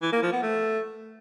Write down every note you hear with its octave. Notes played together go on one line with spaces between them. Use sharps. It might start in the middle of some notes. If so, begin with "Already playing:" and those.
E3
A#3
F3
B3
A3